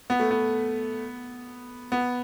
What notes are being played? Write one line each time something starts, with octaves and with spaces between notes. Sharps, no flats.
B3
A3
B3
B3